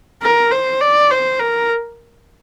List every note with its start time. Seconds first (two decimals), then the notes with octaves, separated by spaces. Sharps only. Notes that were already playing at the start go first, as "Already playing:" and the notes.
0.22 A#4
0.52 C5
0.81 D5
1.10 C5
1.39 A#4